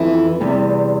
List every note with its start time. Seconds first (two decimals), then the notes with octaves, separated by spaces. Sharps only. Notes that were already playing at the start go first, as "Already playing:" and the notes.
Already playing: F2 E3 B3 E4
0.40 E2 C3 G3